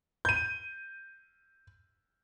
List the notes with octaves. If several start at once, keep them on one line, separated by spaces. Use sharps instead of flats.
G6 D#7